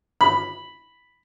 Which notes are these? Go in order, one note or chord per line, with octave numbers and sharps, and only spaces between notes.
B5